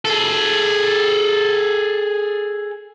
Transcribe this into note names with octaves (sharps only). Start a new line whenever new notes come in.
G#4 A4